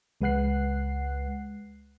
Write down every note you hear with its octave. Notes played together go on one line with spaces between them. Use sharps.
C#2 G#3 B4 F#5 F#6 C7